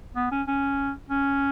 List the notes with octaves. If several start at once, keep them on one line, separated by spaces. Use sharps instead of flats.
B3
C#4
C#4
C#4